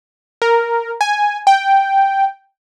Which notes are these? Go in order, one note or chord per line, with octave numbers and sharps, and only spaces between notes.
A#4
G#5
G5